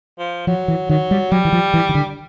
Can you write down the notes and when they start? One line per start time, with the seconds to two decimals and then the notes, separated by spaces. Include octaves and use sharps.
0.19 F3
0.47 F3 F#3
0.68 E3
0.89 D#3 F#3
1.11 G3
1.31 F#3 G3
1.45 E3
1.53 F3
1.74 E3
1.89 D#3
1.95 D3